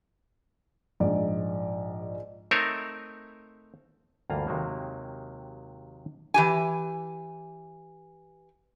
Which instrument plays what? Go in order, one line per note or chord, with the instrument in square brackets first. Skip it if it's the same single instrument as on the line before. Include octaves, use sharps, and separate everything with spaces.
[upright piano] A#1 G#2 D5
[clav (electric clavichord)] A3 C4 D#4 A#4 C#5 E5
D2 G2 E3 A#3 F4 A#5
D#2 C3 D#3 F#3 G#3 A#3
[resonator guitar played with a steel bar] E3 G4 G#5